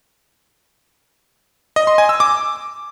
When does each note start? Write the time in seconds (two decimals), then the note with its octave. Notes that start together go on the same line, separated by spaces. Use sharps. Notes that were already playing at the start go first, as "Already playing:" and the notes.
1.76 D#5
1.87 C6
1.98 G#5
2.09 E6
2.20 D6